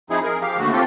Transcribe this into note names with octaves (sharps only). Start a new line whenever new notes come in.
F3 C4 D#4 E4 G#4
G#4 A#4
F3 G4 F5
D#2 D3 A3 F#4
C4 F4 G4 A4